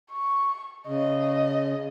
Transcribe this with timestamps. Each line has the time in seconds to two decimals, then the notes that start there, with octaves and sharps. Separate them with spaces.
0.11 C#6
0.87 C#3 D#5